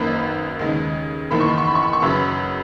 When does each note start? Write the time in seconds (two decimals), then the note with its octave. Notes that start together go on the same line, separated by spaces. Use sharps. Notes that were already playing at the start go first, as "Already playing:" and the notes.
Already playing: G#1 F#2 D#3 A#3 D#4 B4 B5
0.59 D#2 C#3 G#3 D#4
1.31 F#1 E2 D#3 A#3 B5
1.41 C#6
1.49 B5
1.58 C#6
1.67 B5
1.75 C#6
1.84 B5
1.93 C#6
2.02 F#2 C#3 F#3 B4 B5